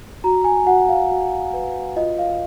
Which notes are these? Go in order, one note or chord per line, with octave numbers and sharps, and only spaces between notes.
F#4 A#5
G#5
G#5
F#4 F#5
F5
F#4
B4
F4 D#5
F5